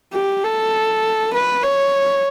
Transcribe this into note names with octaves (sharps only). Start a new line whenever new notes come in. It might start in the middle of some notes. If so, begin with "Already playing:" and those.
G4
A4
B4
C#5